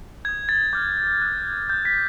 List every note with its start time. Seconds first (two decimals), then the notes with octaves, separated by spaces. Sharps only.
0.25 D#6 G6 G#6
0.49 A6
0.73 D6 F6 G6
1.21 D#6 F#6
1.69 D#6 F#6 G6
1.85 B6